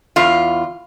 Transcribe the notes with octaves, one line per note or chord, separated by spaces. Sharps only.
E2 F4